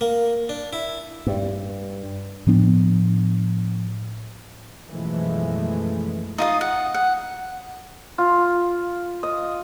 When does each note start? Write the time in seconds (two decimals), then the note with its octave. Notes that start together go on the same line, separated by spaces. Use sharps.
0.01 A#3
0.49 D4
0.73 E4
1.27 G2
2.47 A2 F3 B3 D4
4.88 F#2 B2 E3 F3 G#3 A3
6.38 D#4 F4 D#5
6.61 F#5
6.94 F#5
8.18 F4
9.23 D#5